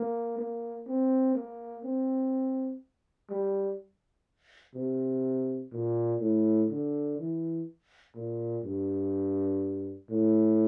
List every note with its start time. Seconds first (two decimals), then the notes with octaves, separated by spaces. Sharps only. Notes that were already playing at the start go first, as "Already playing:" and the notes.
Already playing: A#3
0.38 A#3
0.88 C4
1.35 A#3
1.84 C4
3.30 G3
4.75 C3
5.72 A#2
6.21 A2
6.70 D3
7.19 E3
8.16 A#2
8.64 G2
10.10 A2